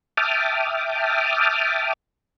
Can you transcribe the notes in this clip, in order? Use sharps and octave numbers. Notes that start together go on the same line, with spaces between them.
E5 G5 A5 D6 D#6 F6